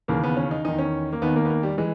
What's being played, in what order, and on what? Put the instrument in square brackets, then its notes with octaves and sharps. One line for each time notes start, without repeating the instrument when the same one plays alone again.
[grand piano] D#2 C#3 E3 A#3
B3
C#4
D#4
E2 D#3 D#4
C#4
A#3
D#2 D#3 B3
A#3
B3
A#3
G3
E3 G#3